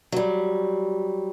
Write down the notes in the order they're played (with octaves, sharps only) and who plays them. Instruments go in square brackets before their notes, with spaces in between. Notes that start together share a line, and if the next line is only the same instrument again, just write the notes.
[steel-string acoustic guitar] F#3 G3